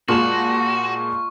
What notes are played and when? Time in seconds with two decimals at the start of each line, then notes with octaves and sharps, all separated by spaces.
0.08 A#2 G#3 F4 F#4 D#5 A5 C#6 E7